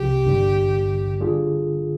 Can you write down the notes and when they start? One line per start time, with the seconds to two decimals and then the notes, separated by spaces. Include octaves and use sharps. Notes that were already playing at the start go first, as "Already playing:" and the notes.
Already playing: C2 C3 F3 G4
0.24 G#1 G2 D3 G3
1.20 D3 G3 D4 F4 G#4